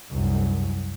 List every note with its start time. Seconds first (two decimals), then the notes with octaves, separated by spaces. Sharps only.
0.12 C2 F#2